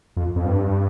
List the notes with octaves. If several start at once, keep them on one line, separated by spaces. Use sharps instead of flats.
F2
F2
G2